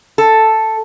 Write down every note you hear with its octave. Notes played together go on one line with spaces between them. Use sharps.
A4